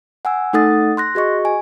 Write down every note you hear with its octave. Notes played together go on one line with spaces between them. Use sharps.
F#5 G#5 E6
A3 D#4 A4 F#5 D#6 A6
C6 F#6 A#6
F#4 G#4 D#5 C#6
G#5